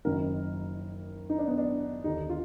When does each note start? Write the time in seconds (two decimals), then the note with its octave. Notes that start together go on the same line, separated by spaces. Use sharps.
0.05 F#1 F#2 D#3 A#4
1.29 D#4
1.39 D4
1.48 B3
1.58 D4
2.04 D#2 D3 D#4
2.29 F4